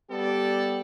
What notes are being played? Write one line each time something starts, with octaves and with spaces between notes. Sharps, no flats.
G3 B3 G4 A4 D5